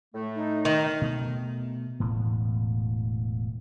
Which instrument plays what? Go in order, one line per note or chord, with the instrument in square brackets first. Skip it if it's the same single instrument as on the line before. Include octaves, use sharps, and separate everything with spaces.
[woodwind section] A2 A3
[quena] D#4
[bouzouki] D#3
[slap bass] B2 A3
E1 A2